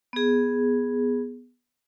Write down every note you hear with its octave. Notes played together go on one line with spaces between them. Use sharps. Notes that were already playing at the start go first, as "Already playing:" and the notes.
B3 G#4